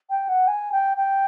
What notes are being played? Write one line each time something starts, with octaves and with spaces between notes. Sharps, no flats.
G5
F#5
G#5
G5
G5